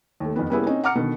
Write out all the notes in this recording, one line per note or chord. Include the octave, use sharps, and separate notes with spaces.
D#2 A3
F2 D#3 B3
G3 A#3 B3 C#4 E4 G#4
C4 C#4 D#4
F#5 A#5 D6 F6 C#7
B2 D3 D#3